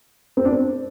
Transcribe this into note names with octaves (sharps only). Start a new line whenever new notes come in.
C4
D4
C4